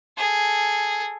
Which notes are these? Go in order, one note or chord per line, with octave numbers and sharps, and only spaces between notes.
G#4 A4